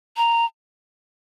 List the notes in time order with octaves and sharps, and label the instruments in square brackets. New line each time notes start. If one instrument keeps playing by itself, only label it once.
[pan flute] A#5